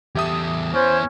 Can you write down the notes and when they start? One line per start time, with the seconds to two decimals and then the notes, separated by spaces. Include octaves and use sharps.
0.15 E2 G4 A4 E5 D#6
0.74 B3 C#4 E4 C5